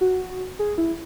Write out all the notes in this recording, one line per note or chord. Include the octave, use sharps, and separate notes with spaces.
F#4
G#4
E4